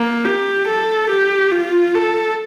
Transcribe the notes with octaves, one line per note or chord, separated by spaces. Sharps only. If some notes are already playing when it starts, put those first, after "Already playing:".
Already playing: A#3
G4
A4
G4
F4
A4